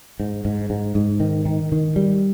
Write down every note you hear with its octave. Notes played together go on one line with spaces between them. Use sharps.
G#2
G#2
G#2
G#2
D#3
D#3
D#3
G3